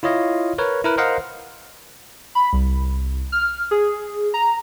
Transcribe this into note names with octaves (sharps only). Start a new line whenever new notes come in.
E4 F4 C#5 D#5 F5
A#4 B4 C#5
E4 A#4 B4
A#4 C5 D#5 F5 F#5
B5
C2
F6
G#4
A#5